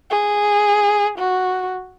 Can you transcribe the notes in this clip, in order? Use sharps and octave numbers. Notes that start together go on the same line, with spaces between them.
G#4
F#4